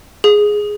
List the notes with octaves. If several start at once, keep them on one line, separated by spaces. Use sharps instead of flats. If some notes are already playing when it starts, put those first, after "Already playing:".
G#4